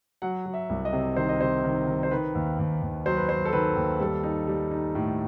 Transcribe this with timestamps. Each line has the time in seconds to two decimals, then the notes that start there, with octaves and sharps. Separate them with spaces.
0.22 F#3 F#5
0.46 F#3
0.54 E5
0.70 C2
0.85 D#5
0.93 C3
1.16 D#3 C5
1.29 D#5
1.41 C3 C5
1.64 D#3
1.88 D#3
2.03 C5
2.11 D#3 B4
2.35 D#2
2.59 D#2
2.82 D#2
3.06 F#3 C5
3.17 B4
3.29 F#3 C5
3.45 A4
3.53 D#3 B4
3.76 D#2
4.00 G3 A4
4.23 D#4
4.48 G3
4.71 D#4
4.95 A2